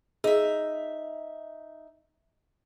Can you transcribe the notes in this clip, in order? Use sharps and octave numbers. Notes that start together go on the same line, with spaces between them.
D#4 G#4 E5